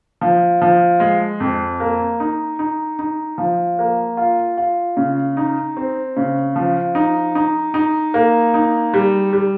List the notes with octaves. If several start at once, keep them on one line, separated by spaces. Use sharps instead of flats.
F3
F3
G#3
F2
A#3
D#4
D#4
D#4
F3
A#3
F4
F4
C#3
D#4
C4
C#3
F3
D#4
D#4
D#4
A#3
D#4
G3
G3